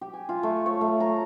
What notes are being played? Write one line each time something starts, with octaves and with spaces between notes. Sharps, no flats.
G4
G#5
F4
A3
C#5
A3
A#5